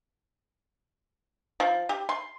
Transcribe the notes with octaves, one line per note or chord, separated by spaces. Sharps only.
F3
G4
C6